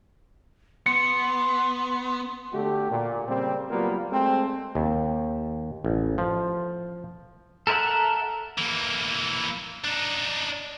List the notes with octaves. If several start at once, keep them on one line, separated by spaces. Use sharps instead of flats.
B3 C6 C#7
D3 A3 F#4 G4
A#2
C#3 G3 A#3 C4
F#3 G3 A#3 B3 F4
G#3 A3 C4
D#2
A1
F3
A4 A#4 C5 E5 F#5
E3 A#3
D4 D#4